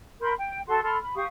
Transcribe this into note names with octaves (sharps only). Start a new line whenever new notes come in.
A#4 B5 C6 G6
G5
F#4 A4 C6
A4 B5 C6 F6
B5
G4 F5 C#6 D#6